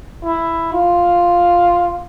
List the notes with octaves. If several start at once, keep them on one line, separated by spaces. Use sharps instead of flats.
E4
F4